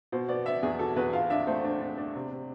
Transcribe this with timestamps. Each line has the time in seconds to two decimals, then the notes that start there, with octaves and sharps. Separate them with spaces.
0.12 B2 C5
0.29 B3 D5
0.46 B3 E5
0.63 E2 G#4
0.79 B2 A4
0.96 E2 B4
1.13 F4 F5
1.30 D4 E5
1.47 A3 C5
1.64 D4
1.80 D4
1.97 D4
2.15 C3
2.31 C3